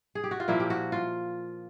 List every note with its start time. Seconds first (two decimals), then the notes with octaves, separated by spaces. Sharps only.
0.15 G#4
0.24 G4
0.31 F#4
0.40 F4
0.48 A#2 F3 A#3 E4
0.60 G4
0.70 F#4
0.92 F4